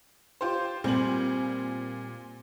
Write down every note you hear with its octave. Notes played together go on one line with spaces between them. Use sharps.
F4 G4 C5
A#2 G3 C4 G#5 F#7